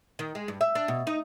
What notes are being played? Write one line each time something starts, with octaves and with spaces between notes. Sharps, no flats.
D#3
G#3
G2
E5
D4
B2
D#4